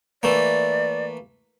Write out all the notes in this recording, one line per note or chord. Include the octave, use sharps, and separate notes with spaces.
E3 A3 A#3 D5